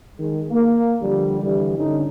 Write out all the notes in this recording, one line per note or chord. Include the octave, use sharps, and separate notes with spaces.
D#3 G#3
A#3
D3 F3 G3
D3 E3 G3
G2 D3 C#4 D#4